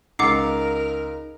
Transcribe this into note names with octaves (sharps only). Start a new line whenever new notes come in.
C#2 C#3 D#4 A#4 F#5 D6 C7